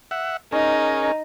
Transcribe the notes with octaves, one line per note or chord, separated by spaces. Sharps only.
E5 F#5
C#4 D#4 G#4 A#4